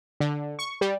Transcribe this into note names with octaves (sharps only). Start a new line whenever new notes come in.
D3
C#6
G3